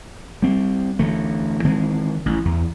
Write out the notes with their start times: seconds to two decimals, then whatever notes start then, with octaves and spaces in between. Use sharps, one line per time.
0.42 G3 C4
0.99 D2 E3 A3
1.65 D#3 E3 G#3 C4
2.26 A1
2.45 E2